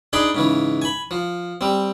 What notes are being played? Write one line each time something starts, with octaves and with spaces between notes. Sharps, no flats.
D4 D#4 G#4 D5 B5 C6
G#2 C#3 E3
G#5 B5
F3
G3 C4